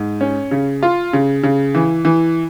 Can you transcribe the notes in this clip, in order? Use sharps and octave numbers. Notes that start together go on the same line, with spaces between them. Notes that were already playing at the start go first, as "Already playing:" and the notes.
Already playing: G#2
C#4
C#3
F4
C#3
C#3
E3
E3